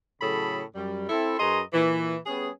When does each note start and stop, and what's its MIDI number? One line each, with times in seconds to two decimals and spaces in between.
0.21 0.62 45
0.21 0.62 49
0.21 0.62 54
0.21 0.62 68
0.21 0.62 69
0.21 0.62 83
0.75 1.07 42
0.75 1.07 55
1.09 1.38 60
1.09 1.38 64
1.09 1.38 69
1.39 1.61 42
1.39 1.61 68
1.39 1.61 71
1.39 1.61 75
1.39 1.61 82
1.39 1.61 84
1.74 2.17 46
1.74 2.17 52
2.26 2.50 55
2.26 2.50 59
2.26 2.50 61
2.26 2.50 68